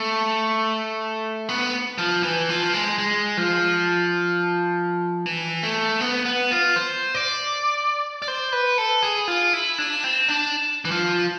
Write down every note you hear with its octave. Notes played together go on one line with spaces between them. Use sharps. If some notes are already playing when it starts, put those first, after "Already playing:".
Already playing: A3
B3
F3
E3
F3
G#3
G#3
F3
E3
A3
B3
B3
F4
C5
D5
D5
C5
B4
A4
G#4
F4
E4
D4
C4
D4
E3
F3